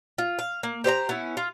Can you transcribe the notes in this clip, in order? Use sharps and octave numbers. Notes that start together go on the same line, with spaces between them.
F4
F5
A#3
G4 C5 D5 A#5
B3 C#4 E4
F4